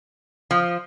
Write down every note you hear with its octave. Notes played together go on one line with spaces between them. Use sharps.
F3